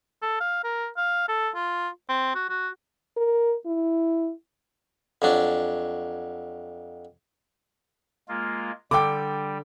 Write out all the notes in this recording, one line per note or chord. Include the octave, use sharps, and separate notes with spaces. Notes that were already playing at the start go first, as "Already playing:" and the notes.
A4
F5
A#4
F5
A4
F4
C4
F#4
F#4
A#4
E4
F2 F#3 D4
G#3 A#3 F4
D3 G3 A4 G5 D6